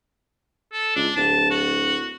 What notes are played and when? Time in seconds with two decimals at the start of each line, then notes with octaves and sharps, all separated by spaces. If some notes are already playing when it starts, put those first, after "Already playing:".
0.73 A4
0.96 C#2 D4
1.16 D1 A5
1.50 F#4